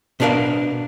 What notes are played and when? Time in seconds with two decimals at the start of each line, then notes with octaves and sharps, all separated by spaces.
0.20 B2 B3 D4 F#4 A#4 F5